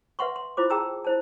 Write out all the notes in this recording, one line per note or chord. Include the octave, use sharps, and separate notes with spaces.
B4 E5 F#5 C6 C#6
C6
E4 F4 C5 D6
G#4 G5 A5 A#5 D#6 E6
E4 C5 A5